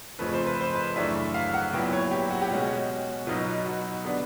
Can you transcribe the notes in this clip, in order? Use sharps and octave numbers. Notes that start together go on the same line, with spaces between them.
F2 C#3 F3 A3 B4
C5
B4
C5
B4
F#2 C#3 E3 A3 D4 E5
F5
F#5
A#2 F#3 B3 E4 G5
C#5
G4
F#4
G4
B2 G#3 C#4 F#4
B2 F#3 B3 D#4 F4
F#4
D3 G3 B3 D4